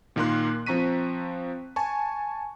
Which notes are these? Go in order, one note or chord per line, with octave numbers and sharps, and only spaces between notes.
A#2 D#3 A#3 A#4 C6 F#6
F3 C4 A#5 C#6 B6 D#7
G#5 A5 C#6